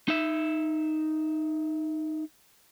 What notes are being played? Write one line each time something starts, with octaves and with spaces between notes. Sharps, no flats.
D#4 E5